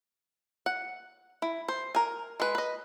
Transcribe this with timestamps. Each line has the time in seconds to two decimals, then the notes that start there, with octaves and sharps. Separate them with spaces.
0.66 F#5
1.42 E4
1.68 C5
1.95 A#4 G#5
2.40 G#3 B4
2.55 B4 D#5